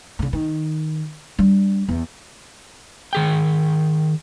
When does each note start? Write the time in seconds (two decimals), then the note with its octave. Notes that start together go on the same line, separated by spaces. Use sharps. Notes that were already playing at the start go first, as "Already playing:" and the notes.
0.19 G2 C#3
0.33 D#3
1.39 G3 D4
1.89 E2
3.13 D#3 G#4 G5